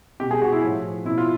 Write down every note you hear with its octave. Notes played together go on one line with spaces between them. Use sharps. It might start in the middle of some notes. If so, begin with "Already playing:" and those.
B2 G4
G#4
F#4
E4
A2 F3
B2 E4
F4